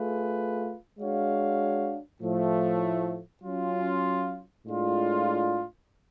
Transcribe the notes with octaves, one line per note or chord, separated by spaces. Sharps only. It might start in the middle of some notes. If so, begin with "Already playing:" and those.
Already playing: A3 F4 G#4 B4
G#3 D4 F#4 C#5 F5
A2 F3 A3
F#3 C#4 F4
A2 G#3 D4 F4